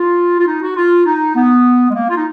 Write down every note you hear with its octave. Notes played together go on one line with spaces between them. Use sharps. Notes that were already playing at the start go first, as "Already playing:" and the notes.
Already playing: F4
F4
D#4
F#4
F4
D#4
B3
G#3
A#3
F4
D#4